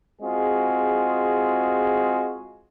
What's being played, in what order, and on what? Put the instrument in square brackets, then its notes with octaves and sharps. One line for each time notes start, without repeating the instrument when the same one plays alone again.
[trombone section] G#3 C4 F4 F#4 G#4